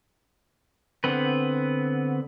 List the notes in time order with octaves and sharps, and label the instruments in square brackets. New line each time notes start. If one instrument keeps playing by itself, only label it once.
[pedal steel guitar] D3 B3 C4 B4